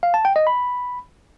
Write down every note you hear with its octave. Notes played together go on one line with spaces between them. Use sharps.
F5
A5
G5
D#5
B5